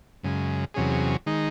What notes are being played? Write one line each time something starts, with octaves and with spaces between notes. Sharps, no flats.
F#2 C#3 G#3
E2 C3 F#3 C#4 G#4
D#3 G#3 D#4